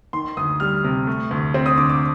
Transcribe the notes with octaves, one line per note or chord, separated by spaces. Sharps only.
D#3 C6
D2 D#6
G3 F6
C3
A3
D2
C4
D#6
D3 D6
D6